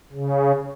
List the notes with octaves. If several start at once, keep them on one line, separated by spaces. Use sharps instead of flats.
C#3